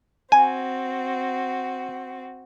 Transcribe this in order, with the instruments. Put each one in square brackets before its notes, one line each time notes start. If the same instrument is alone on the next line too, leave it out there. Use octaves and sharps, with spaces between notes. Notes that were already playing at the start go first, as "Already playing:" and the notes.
[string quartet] C4 F#4 [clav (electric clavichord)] G#5